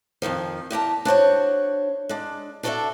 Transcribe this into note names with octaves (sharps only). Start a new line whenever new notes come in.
F2 G#2 D#3 F3
E2 G4 A#4 A5
D4 F#4 C5 C#5
G#3 D4
D4 F#4 A4 C#5 D5 E5